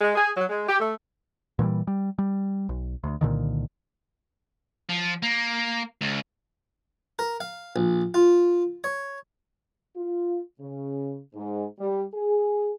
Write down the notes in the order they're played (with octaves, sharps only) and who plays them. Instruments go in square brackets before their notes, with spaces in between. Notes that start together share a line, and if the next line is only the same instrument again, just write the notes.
[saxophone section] G#3
G#4
F#3
G#3
G4
A3
[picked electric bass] A#2 E3 F#3 G3
G3
G3
B1
D2
C2 A#2 D3 D#3
[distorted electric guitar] F3
A#3
C#2
[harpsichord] A#4
F5
A#1
F4
C#5
[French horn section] F4
C#3
G#2
G3
G#4